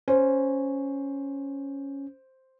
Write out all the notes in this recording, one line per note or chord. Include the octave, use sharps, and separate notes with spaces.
C#4 C5